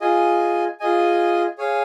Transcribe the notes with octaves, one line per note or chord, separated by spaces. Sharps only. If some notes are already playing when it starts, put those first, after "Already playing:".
F4 G#4 D#5 G#5
F4 G#4 D#5 G#5
G#4 C#5 F5 G#5